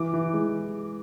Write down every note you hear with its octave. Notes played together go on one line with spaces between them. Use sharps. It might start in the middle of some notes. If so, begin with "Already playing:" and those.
Already playing: E3 D6
E3
G#3